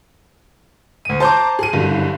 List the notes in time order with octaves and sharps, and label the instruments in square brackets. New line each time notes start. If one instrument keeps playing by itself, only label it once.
[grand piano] D2 D#7
[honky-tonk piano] C5 A#5 D6 [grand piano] A5 C6 G6
[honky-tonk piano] G#4 D#7
F#1 G2 D3